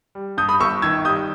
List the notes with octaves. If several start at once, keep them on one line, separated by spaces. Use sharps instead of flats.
G3
G2 D#6 G6
B5 D#6
G1 C#6 E6
D#3 E6 G#6
G3 D#6 G6